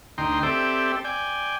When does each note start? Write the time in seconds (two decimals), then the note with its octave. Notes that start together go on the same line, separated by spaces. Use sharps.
0.18 D2 D#4 G5 A#5 C6
0.43 C4 G4 A4 D5 E5
1.04 D5 G5 G#5